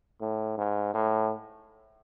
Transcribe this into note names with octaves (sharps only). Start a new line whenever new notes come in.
A2
G#2
A2